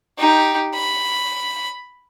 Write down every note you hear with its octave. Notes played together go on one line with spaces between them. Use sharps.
D#4 G4
B5